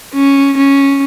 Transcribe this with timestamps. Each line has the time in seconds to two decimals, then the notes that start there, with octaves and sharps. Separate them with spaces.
0.14 C#4
0.57 C#4